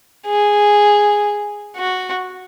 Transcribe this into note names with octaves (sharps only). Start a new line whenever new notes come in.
G#4
F#4